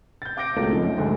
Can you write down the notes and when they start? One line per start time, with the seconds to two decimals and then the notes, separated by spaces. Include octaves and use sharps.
0.22 G6 A6
0.37 F5 D6 G6 A#6 D7
0.56 C#2 B2 A3 C4
0.72 F3 A3 C#4 D#4
0.85 F#2
0.98 D2 G#2 D3